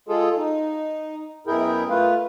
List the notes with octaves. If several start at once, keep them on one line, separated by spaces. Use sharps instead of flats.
G#3 F4 G#4 A4
D#4
F#2 B2 E4 G#4 A#4 G5
A3 F4 B4 F5